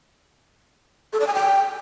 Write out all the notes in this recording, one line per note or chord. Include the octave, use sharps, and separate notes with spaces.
A4
D5
G#5
G5